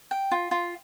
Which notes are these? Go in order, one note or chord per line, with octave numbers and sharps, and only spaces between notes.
G5
F4
F4